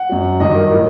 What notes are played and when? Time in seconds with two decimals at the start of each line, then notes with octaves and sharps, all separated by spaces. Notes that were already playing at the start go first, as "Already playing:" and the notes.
Already playing: F#5
0.09 F#2 F#3
0.40 G2 D#3 F#3 D#5
0.55 A#4
0.72 A2 F#3